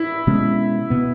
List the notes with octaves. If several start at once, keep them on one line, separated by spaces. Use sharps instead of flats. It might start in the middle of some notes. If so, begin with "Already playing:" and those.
Already playing: E4
B2 G#3 C#4
B2 B3